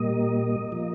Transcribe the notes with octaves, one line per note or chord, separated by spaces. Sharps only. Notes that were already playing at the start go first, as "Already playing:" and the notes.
Already playing: A#2 G3 A#3 D#5
F3 A#3